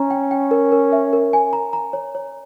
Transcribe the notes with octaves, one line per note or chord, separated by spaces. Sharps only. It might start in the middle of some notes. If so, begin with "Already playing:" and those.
Already playing: C#4 A#5
G5
G5
A#4
A#4
E5
A#4
G#5
A#5
A#5
C#5
C#5